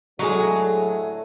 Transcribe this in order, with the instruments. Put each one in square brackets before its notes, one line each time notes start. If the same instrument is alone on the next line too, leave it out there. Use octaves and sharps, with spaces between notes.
[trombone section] A2 D3 A3 [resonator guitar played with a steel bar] F#3 G#3 G#4